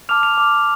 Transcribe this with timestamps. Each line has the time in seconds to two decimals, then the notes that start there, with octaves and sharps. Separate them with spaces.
0.09 A5 D6 F6 F7
0.23 F7
0.37 A5 D6 F6